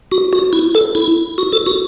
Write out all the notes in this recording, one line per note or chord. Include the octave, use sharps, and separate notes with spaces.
F#4
F#4
E4
A4
E4
F#4
A4
F#4